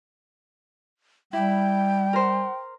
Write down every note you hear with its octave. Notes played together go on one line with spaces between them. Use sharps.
G3 E4 G5
A#4 C5